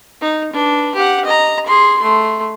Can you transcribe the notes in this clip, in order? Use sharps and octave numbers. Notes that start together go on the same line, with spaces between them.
D#4
D4 B4
G4 F#5
D#5 A#5
G#4 C6
A3 C6